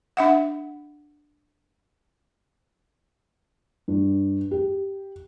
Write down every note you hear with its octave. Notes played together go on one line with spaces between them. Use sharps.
D4 E5 F#5
G2
G4